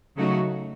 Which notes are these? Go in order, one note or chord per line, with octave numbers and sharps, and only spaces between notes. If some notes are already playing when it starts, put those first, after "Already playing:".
C#3 F#3 A3 D#4 F#4